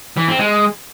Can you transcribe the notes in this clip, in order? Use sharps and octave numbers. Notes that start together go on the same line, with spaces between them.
E3
C4
G#3